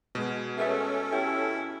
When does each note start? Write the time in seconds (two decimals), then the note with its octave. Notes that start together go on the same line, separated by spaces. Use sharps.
0.15 B2 G#3
0.58 A3 C#4 G#4 A4 B4 E5
1.12 E4 G4